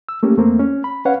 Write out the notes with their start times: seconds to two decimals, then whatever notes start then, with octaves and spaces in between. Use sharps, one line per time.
0.09 E6
0.23 A3 A#3 C#4 G4
0.37 E2 A3 A#3 C4
0.59 C#4
0.84 B5
1.05 C#4 B4 C#5 F5 F#5